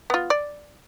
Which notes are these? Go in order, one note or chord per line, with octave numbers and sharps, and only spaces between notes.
B3 F4
D5